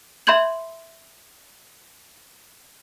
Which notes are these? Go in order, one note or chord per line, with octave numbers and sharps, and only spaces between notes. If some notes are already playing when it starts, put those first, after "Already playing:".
E5 B5 C6 G6 G#6 F#7